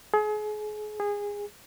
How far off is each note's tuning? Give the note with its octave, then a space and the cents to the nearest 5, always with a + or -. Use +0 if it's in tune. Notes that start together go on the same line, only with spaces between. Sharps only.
G#4 +35
G#4 -20